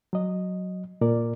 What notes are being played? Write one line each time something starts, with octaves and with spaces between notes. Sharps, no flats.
F#3 D#5
A#2 A#4 D5